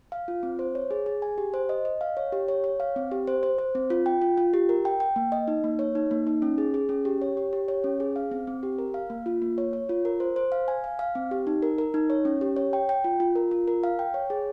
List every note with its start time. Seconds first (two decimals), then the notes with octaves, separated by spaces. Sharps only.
0.12 F5
0.28 F4
0.43 C4
0.59 C5
0.75 C#5
0.91 G#4
1.06 G#4
1.22 G#5
1.38 G4
1.54 C5
1.69 D#5
1.85 D#5
2.01 F5
2.17 C#5
2.32 G4
2.48 C#5
2.64 C#5
2.80 F5
2.96 C4
3.12 G4
3.27 C5
3.43 C5
3.59 C5
3.75 C4
3.90 F4
4.06 G5
4.22 F4
4.38 F4
4.54 G4
4.69 A#4
4.85 G5
5.00 G5
5.16 A#3
5.32 D#5
5.48 D#4
5.64 A#3
5.79 C#5
5.95 D#4
6.11 A#3
6.27 D#4
6.42 C#4
6.58 G#4
6.74 G#4
6.89 C#4
7.05 G4
7.22 C#5
7.37 G4
7.53 G4
7.68 C#5
7.84 C#4
8.00 G#4
8.16 F5
8.31 C4
8.47 C4
8.63 G4
8.78 A#4
8.94 F5
9.10 A#3
9.26 F4
9.42 A#3
9.58 C#5
9.73 C#5
9.89 F4
10.05 A#4
10.20 C5
10.36 C5
10.52 F5
10.68 G#5
10.84 F5
10.99 F5
11.15 C4
11.31 G4
11.47 D#4
11.63 A#4
11.78 A#4
11.94 D#4
12.10 C#5
12.25 C#4
12.41 G4
12.56 C#5
12.73 G5
12.89 G5
13.04 F4
13.20 F4
13.36 A#4
13.51 F4
13.68 A#4
13.84 F5
13.99 G5
14.14 C#5
14.30 G#4